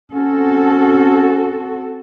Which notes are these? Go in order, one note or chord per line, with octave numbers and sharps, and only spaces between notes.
C4 C#4 F#4 A4